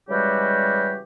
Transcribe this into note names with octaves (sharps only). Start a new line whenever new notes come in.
C#3 E3 G3 G#3 F#4 G4